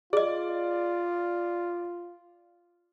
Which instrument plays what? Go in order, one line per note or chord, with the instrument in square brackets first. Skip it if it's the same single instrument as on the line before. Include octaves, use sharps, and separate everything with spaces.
[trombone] F4 [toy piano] G#4 D#5 [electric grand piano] D5